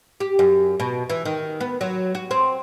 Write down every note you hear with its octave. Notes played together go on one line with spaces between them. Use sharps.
G4
F#2
B2
E3
D#3
B3
F#3
F#4
C4